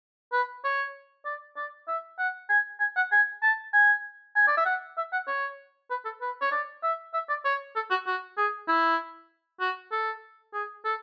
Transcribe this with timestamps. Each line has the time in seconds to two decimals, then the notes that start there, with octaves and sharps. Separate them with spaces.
0.32 B4
0.64 C#5
1.25 D5
1.56 D5
1.88 E5
2.19 F#5
2.49 G#5
2.80 G#5
2.96 F#5
3.12 G#5
3.43 A5
3.73 G#5
4.36 G#5
4.48 D5
4.57 E5
4.65 F#5
4.97 E5
5.13 F#5
5.27 C#5
5.90 B4
6.05 A4
6.21 B4
6.41 C#5
6.52 D5
6.83 E5
7.14 E5
7.29 D5
7.45 C#5
7.76 A4
7.90 F#4
8.07 F#4
8.37 G#4
8.68 E4
9.61 F#4
9.92 A4
10.53 G#4
10.85 A4